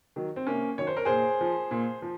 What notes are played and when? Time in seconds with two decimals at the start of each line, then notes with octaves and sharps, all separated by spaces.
0.16 D#3 F#3
0.36 C4
0.47 C3 A#3 C#4
0.78 D#3 F#3 C#5
0.87 C5
0.96 A#4
1.05 A#2 G#4 C5
1.41 F3
1.71 A#2
2.02 F3